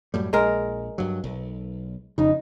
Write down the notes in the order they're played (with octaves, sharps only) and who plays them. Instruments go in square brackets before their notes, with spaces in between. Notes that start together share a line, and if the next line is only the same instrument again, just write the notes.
[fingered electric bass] F#2 A2 G3
[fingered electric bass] A#1 [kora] G#3 A#4
[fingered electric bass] G2 F#3
B1
[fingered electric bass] E1 F2 C#3 [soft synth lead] D#4